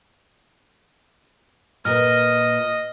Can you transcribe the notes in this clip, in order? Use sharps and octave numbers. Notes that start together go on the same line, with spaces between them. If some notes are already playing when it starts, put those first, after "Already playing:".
A#2 A#4 B4 D#5 F6